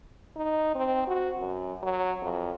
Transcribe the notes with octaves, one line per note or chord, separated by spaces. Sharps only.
D#4
C4
F#4
F#2
F#3
F2